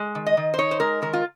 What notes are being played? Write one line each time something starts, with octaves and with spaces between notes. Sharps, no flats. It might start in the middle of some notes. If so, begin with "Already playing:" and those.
Already playing: G#3
D#3
D#5
D#3
C5
D#4 C#5
C5
G#3 A#4
D#3 A#4
F4